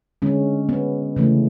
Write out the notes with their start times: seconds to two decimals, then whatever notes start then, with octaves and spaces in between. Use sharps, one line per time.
0.22 D3 G#3 C#4
0.69 B3
1.16 C#3 E3 A3